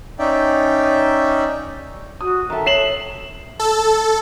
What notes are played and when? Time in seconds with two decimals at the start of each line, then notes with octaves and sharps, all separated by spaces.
0.19 C#4 D#4 D5 E5 G5
2.21 F#4 D#6
2.50 D#3 A4 E5
2.66 C#5 C7 E7 F#7
3.60 A4